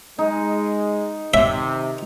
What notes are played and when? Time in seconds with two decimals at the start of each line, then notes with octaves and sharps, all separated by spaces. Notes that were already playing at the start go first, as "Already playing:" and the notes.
0.19 G#3 D#4
1.34 C3 D#3 E5